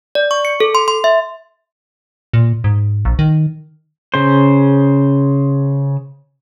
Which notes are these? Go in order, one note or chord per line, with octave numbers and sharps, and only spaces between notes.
D5
C#6
C#7
A4
C6
C6
E5
A#2
G#2
A#1
D#3
C#3 C5